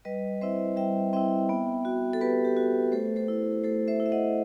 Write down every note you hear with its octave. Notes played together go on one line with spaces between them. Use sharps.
G3 B4 D#5
C4 E4 C5 E5
G3 E5 G5
C4 E4 E5 G5
B3
F#4
A4
B3 G4 B4
G4
F#4
A3 A4 C5
A4 C5
E4
A3 A4 C5
C5 E5
E4
E5
D#5 F#5